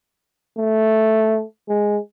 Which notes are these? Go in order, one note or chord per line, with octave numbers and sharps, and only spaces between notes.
A3
G#3